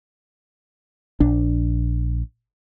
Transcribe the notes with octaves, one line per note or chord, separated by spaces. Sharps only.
A#1 D4